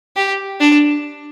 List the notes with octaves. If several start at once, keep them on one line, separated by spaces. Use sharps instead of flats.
G4
D4